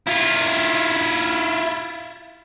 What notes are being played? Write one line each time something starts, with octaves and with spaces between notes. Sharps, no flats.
E4 F4